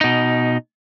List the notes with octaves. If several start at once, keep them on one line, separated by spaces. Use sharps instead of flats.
B2 D#4